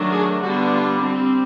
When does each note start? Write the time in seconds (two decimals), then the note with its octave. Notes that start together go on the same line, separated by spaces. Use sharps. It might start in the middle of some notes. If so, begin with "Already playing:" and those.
Already playing: D#3 F#3 A3 D4
0.11 G#4
0.42 D3 G3 B3 D4 F#4
0.73 F4
1.04 G3 C4